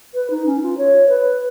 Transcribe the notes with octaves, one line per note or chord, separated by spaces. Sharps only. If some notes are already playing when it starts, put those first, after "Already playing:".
B4
D#4
C#4
F4
C#5
B4